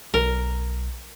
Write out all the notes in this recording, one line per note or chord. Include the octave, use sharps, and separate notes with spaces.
B1 A#4